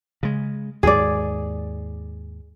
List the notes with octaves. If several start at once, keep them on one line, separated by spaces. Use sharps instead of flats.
C#3 G#3
D#2 G#2 G#4 D5